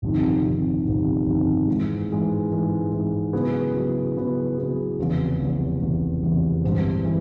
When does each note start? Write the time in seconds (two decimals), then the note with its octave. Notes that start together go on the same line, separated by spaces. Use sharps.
0.02 G1 F2 C3 D#3
0.43 G1 F2 C3 D#3
0.85 G1 F2 C3 D#3
1.26 G1 F2 C3 D#3
1.67 G#2 E3 G#3
2.09 G#2 E3 G#3
2.50 G#2 E3 G#3
2.92 G#2 E3 G#3
3.33 C#3 F#3 B3 E4 G#4
3.74 C#3 F#3 B3 E4 G#4
4.16 C#3 F#3 B3 E4 G#4
4.57 C#3 F#3 B3 E4 G#4
4.98 F1 E2 C#3
5.40 F1 E2 C#3
5.81 F1 E2 C#3
6.22 F1 E2 C#3
6.64 G1 G2 E3 G#3 C4
7.04 E3 G#3